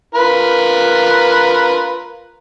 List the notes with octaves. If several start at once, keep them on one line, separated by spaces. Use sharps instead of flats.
F4 A#4 B4